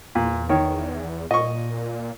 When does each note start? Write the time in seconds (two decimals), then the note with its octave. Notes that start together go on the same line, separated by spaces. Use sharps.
0.15 E2 A#2
0.49 D#3 C#5
1.31 A#2 D#5 C#6